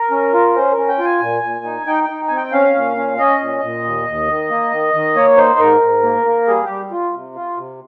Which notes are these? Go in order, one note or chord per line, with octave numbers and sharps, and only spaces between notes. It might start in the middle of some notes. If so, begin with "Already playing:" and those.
Already playing: A#4
C#4
F4
C#4 C5
A#4
C#4
G5
F4
G#5
A#2
A#2
D#4
D#4 G5
G5
D#4
C4 G#5
G5
C#4 F5
A#2
C#4
C#4 D#5
A#2
A#2
D#2
D#2
D#3
A#3
D#3
D#3
A#3 C#5
D#4 C5
G#2 A#4
G#2
A#3
A#3
G3 G#4
G3 G4
F4
C3
F4
C3